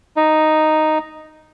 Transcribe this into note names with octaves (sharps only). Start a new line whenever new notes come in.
D#4